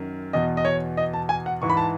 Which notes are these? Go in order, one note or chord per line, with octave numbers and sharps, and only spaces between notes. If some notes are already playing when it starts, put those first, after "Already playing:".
Already playing: F#2 D#3
E2 B2 D#5
D#5
C#5
D#5
A5
G#5
F#5
G#2 E3 C#6
B5
A5